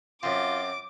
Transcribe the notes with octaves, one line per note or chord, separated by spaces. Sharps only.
F#2 C4 F4 D6